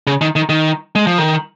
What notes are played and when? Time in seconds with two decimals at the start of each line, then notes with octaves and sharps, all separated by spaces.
0.07 C#3
0.21 D#3
0.36 D#3
0.49 D#3
0.95 G#3
1.07 F3
1.18 D#3